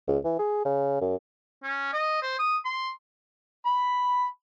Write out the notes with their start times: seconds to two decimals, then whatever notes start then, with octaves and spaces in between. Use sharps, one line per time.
0.08 C#2
0.24 E3
0.39 G#4
0.65 C#3
1.01 F#2
1.63 C#4
1.93 D#5
2.22 C5
2.39 D#6
2.65 C6
3.66 B5